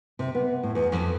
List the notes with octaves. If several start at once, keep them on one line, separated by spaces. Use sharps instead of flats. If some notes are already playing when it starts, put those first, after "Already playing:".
C3
B3
A2
E2
F2